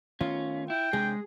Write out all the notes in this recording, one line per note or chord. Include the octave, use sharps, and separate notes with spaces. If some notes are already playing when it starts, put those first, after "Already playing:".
D#3 A3 B3 C#4 F4
E4 G5
C3 G#3 D4 G#4